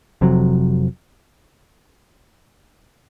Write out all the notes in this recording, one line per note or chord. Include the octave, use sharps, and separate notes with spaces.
F1 F2 C3 F#3